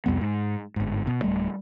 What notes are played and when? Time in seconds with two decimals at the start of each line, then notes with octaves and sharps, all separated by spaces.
0.06 C2 F2 G3 B3
0.21 G#2
0.76 G1 G#2
1.07 B2
1.22 D1 G3 A3